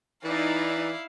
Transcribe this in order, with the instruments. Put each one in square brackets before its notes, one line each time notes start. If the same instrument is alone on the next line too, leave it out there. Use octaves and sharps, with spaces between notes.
[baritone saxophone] E3 [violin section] D#4 D5 [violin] E4 F5